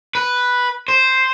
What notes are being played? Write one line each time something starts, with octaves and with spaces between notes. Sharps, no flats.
B4
C5